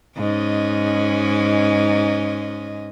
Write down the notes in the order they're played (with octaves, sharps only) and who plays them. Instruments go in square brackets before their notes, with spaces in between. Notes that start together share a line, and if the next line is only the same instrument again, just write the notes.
[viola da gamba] G#2 C#4 D#5